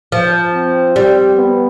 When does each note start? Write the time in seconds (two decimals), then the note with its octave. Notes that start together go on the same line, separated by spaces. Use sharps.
0.12 F3
0.54 C4
0.96 G3
1.36 B3